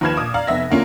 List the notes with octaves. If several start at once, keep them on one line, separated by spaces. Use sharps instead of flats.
D#2 F3 B4 F6 G#6 E7
A#2 D6 D#6
D5 F5 A#5
F1 B3 E5 A#6
D3 A#3 C#4 F4